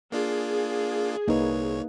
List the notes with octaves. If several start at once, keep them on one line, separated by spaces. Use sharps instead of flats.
A#3 D4 F4 G#4
C2 A#3 D#4 B4 C#5